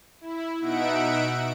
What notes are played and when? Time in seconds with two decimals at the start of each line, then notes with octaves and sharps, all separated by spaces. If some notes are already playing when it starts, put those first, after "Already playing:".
0.21 E4
0.60 B2 D#4 E5 F#5 D7